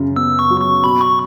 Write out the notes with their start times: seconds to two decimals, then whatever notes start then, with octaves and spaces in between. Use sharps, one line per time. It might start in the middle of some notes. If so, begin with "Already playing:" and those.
Already playing: F#2 C#3
0.16 B3 E6
0.39 C#6
0.50 F#3
0.61 C#6
0.84 B2 B5
1.01 C#6